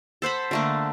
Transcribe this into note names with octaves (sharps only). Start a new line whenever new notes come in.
A4 C5 F#5 B5
D3 A3 A#3